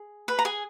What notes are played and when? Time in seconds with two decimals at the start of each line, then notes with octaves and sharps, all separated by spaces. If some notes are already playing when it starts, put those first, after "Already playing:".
Already playing: G#4
0.28 B4 B5
0.39 A#5
0.45 G#4 G#5